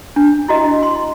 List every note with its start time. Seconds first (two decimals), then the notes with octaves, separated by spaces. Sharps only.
0.16 D4
0.48 E4 F#4 D#5
0.83 C6